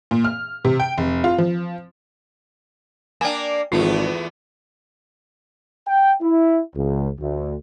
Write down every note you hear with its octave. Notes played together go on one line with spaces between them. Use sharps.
A#2
F6
C3
G5
F1
F4
F3
A#3 D4 G5 G#5
G#1 E2 A3 B3 F4
G5
E4
C#2
D2